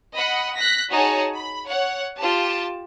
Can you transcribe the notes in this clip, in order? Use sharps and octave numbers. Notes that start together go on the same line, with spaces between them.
D#5 F#5 B5
F#6 A#6 B6
D#4 F#4 G#4 C#5 G#5 A5
B5
C#5 F#5
F4 G4 A5